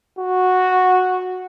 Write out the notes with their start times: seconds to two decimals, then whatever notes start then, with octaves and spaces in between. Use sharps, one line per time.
0.18 F#4